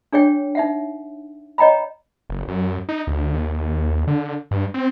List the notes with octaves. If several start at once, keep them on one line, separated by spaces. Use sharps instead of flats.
D4 G#4 C#5 G5
D#4 E5 F#5
C#5 D#5 G5 A#5 B5
F#1
F#2
D#4
D2
D#2
D3
G2
C4